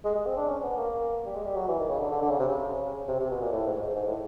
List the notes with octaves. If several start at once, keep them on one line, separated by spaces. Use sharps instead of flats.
G#3
G#3
C4
D4
C#4
B3
A#3
G3
G#3
G3
F#3
E3
D#3
C#3
D3
D3
D3
C#3
C3
C#3
C3
C3
B2
A#2
A2
G#2
G#2
G#2
A2